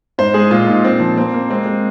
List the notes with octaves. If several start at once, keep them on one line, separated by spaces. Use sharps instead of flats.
G#2 C5
G#3 G#4
A#2 F4
A#2 D#4
A#2 C4
F3
A#3 C4
A#3
G#3 C4
G#3